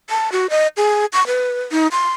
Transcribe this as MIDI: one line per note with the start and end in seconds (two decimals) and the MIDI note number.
0.10 0.31 81
0.32 0.47 66
0.50 0.67 75
0.77 1.05 68
1.13 1.26 85
1.27 1.61 71
1.72 1.87 63
1.92 2.12 84